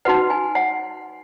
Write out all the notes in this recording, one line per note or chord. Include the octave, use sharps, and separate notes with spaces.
D#4 F#4 B4 F#5
G#5
F#5